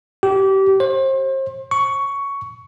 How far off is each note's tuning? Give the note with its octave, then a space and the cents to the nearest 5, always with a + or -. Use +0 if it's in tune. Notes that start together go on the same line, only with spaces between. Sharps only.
G4 -25
C5 +35
C#6 +10